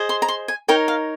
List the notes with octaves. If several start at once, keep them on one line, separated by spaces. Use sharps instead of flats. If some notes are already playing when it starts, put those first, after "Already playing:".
Already playing: G#4 C5 D#5
C6
A#5
C6
G#5
D#4 A#4 C#5 G5
F5